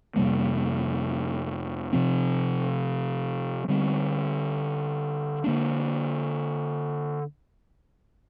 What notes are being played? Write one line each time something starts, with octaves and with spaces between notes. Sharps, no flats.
F2 C3 G3 A#3
C3 F3 C4
D3 G3 C4
D3 A#3 D4